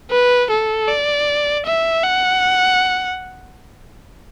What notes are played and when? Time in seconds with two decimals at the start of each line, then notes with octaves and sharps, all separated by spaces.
0.11 B4
0.50 A4
0.88 D5
1.66 E5
2.04 F#5